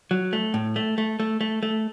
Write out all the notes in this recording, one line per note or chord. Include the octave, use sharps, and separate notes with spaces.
F#3
A3
A2
A3
A3
A3
A3
A3